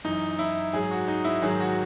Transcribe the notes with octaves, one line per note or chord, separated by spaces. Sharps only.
F#2 E3 D#4
E4
G#2 F#3 G#4
F#4
D#4
E4
G#2 D#3 F#3 G#4
F#4